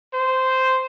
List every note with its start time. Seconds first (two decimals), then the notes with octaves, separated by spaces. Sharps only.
0.14 C5